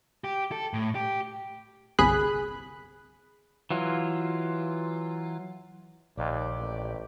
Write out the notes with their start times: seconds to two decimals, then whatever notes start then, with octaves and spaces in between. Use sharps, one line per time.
0.24 G4
0.52 A4
0.73 A2
0.95 G4
1.99 G1 C2 G#4 B5 F#6
3.71 E3 F#3 F4
6.18 A#1 D#2 G4 D5
6.57 A1